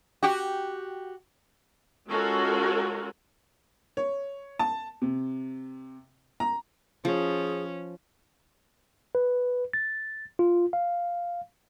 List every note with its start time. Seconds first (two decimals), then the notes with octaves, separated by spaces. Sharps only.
0.23 F#4 G4
2.09 G#3 C#4 F4 F#4 A4 A#4
3.97 C#5
4.59 A5
5.02 C3
6.40 A#5
7.05 F3 C#4 G#4
9.15 B4
9.73 A6
10.39 F4
10.73 F5